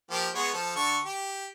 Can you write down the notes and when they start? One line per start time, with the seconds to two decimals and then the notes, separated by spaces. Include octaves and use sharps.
0.11 F3 A#3 G4
0.35 G#3 B3 C#5
0.53 F3 A4
0.76 D3 A5 C#6
1.04 G4